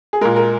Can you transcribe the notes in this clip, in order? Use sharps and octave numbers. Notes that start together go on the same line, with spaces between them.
G#4
A#2 G#3 A#4
A#4